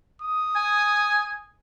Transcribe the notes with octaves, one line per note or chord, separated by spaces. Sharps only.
D#6
G#5